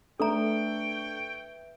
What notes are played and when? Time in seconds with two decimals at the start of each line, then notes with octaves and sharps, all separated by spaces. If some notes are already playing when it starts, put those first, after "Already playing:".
0.20 A3 D4 A4 B4 C#5 E5 G5 A#5